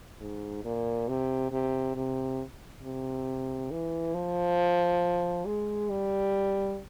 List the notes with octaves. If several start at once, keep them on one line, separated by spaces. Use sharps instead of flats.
G#2
A#2
C3
C3
C3
C3
E3
F3
G#3
G3